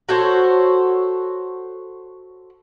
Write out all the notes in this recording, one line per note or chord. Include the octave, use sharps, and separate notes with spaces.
F#4 A4 C5 C#5